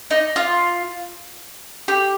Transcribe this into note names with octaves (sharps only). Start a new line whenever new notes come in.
D#4
F4
G4